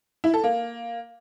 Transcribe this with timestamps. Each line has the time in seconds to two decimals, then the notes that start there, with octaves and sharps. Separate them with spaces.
0.24 E4
0.34 A4
0.44 A#3